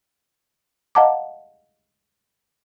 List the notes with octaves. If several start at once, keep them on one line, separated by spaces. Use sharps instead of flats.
D#5 F5 F#5 A5 A#5 D6